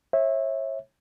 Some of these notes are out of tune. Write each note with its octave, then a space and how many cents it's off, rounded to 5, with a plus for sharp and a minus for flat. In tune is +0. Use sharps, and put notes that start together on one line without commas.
C#5 -35 E5 -10